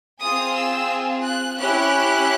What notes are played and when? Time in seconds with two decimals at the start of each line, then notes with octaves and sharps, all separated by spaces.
0.20 C4 F4 G#4 D#6
0.55 E6
1.24 F#6
1.59 C#4 E4 G4 F#6